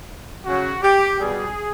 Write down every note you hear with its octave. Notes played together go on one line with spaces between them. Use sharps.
C#3 F#3 F#4
G4
B2 G3 G#4